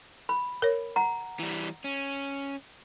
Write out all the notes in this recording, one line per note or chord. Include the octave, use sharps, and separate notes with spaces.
B5
A#4 C#5
F#5 A#5
E3 G3
C#4